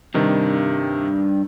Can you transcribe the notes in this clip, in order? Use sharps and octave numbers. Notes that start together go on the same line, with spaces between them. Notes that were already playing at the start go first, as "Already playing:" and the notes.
G2 C3 D#3